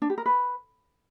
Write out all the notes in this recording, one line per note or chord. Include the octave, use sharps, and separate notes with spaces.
D4
G4
A#4
B4